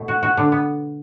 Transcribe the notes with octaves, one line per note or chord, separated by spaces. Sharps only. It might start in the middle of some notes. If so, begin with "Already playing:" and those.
Already playing: B2 A3
F#4
F#4
D3
B3